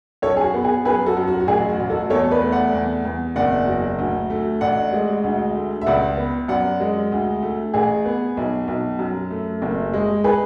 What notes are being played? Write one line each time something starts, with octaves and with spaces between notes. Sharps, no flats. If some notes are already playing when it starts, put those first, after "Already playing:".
F#2 A4 C#5
G#4
F#4
B3
G#4
F#2 G#4 B4
F#4 A4
F#2
F#4
F#4
A1 G#4
F#4
A1
F#4 A4
E2 A4 C#5
B4 D5
A3
D5 F#5
E2
E2
F#1 D5 F#5
F#3
D2
A3
A1 D5 F#5
G#3
D2
A3
E5
C#2 D5 F#5
B3
F#2 D5 F#5
G#3
D2
A3
A1 G#4
B3
B1
B1
F#2
A3
F#1
G#3
G#4 B4